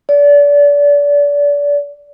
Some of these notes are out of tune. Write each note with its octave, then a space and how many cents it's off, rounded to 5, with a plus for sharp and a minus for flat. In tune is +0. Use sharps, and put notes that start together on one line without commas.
D5 -30